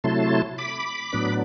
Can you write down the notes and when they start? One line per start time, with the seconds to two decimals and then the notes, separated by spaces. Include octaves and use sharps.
0.04 C3 F#3 A3 E4 A5 C6
0.58 B5 D6
1.13 A2 F#3 B3 D4